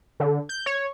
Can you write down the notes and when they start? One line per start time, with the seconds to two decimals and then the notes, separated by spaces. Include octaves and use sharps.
0.20 D3
0.49 G6
0.66 C#5